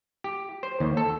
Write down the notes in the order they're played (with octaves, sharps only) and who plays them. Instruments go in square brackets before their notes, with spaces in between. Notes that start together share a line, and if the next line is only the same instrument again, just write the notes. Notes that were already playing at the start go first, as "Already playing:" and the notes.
[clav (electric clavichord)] G4
C5
D#2
A4